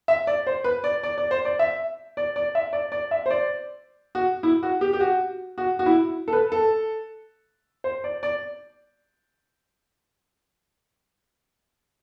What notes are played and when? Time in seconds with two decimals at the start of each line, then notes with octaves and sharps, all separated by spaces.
0.08 E5
0.27 D5
0.47 C5
0.64 B4
0.84 D5
1.03 D5
1.18 D5
1.31 C5
1.45 D5
1.59 E5
2.17 D5
2.36 D5
2.55 E5
2.73 D5
2.92 D5
3.11 E5
3.26 C5
3.30 D5
4.15 F#4
4.43 E4
4.63 F#4
4.81 G4
4.93 G4
5.00 F#4
5.58 F#4
5.79 F#4
5.86 E4
6.28 A4
6.33 B4
6.52 A4
7.84 C5
8.04 D5
8.23 D5